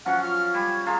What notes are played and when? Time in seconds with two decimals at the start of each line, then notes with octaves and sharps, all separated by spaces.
0.06 F3 F#3 C#4 F#5
0.22 F6
0.54 G3 G#6
0.86 F4 G#4 A#5